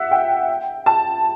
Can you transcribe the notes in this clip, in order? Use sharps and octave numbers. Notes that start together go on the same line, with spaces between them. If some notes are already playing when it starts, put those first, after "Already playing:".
Already playing: E5 F#5
G5
A5